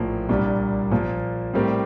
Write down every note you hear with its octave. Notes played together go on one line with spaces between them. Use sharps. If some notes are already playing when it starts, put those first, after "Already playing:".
Already playing: A#1 A2 F3 A#3
C2 A#2 G3 A#3 D4
A#2 F3 A#3
A2 G3 C4 G4 A#4